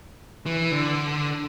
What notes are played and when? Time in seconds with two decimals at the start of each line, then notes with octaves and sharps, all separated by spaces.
0.46 E3
0.72 D3